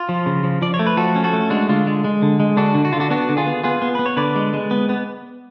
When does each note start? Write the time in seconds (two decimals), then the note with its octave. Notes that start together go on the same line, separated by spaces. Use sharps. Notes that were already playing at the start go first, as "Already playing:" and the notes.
Already playing: F4
0.09 F3
0.26 C#3
0.44 F3
0.62 F3 D5
0.74 C#5
0.79 A3
0.87 B4
0.97 F3 F#4 A4
1.15 C#4
1.24 F#4 A4
1.33 A3
1.50 G#3 D4 F#4
1.69 D3 F4
1.87 G#3
2.04 G#3
2.22 D3
2.40 G#3
2.57 D3 D4 F#4
2.75 D3
2.85 F#4
2.93 D3 F4
3.00 D4 F#4
3.10 B3 D4 F#4
3.29 D3
3.37 F4 G#4
3.47 B3
3.63 B3 F4 G#4
3.82 B3
3.95 B3 B4
4.06 C#5
4.17 D3 B4 D5
4.35 G#3
4.54 G#3
4.71 B3
4.89 B3